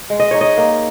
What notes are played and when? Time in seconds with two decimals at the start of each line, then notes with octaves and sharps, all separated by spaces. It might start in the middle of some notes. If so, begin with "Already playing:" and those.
0.10 G#3
0.20 D#5
0.31 D#4 C#5
0.41 D#5
0.58 A#3